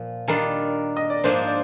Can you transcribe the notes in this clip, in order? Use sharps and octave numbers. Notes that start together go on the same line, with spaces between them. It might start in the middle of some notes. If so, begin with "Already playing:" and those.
Already playing: A#2 F3
D#3 G3 D4 F4 A#4
D#5
D5
G#2 F3 A#3 D4 C5
D5